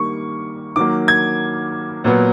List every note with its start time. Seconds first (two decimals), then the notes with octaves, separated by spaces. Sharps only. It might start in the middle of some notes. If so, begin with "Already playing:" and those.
Already playing: D#3 G3 A#3 C#6
0.76 D#3 F#3 A#3 D6
1.08 G#6
2.04 A#2 F#3 B3